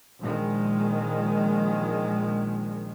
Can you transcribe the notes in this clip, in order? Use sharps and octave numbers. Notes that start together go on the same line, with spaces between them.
A#1 D#3 G#3